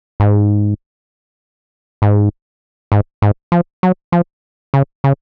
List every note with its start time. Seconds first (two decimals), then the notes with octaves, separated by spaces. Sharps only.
0.20 G#2
2.02 G#2
2.92 G#2
3.22 G#2
3.52 F3
3.83 F#3
4.12 F3
4.74 C#3
5.04 C#3